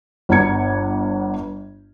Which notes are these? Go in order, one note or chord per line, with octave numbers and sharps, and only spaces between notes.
G1 B3 D4 A#5 G#6 C#7